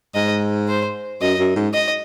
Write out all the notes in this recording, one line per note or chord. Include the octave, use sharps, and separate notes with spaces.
G#2 D#5
C5
F#2 D#5
F#2
G#2
D#5